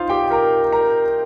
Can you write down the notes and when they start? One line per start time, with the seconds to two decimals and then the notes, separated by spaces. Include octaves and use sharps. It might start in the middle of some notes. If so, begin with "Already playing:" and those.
Already playing: D#4 F4 C5 F5
0.09 G4 G5
0.30 A#4 A#5
0.72 A#4 A#5